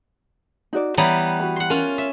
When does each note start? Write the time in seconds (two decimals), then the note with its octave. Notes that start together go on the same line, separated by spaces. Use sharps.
0.73 D#4 F#4 D5
0.98 E3 G3 B3 C#5 A#5 B5
1.40 F#4 B5
1.56 F#5 C6
1.70 C#4 F4 A#4
1.98 E5